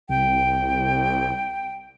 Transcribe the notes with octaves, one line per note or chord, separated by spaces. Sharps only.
C2 G5